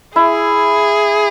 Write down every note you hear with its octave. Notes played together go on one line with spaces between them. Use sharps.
E4 G#4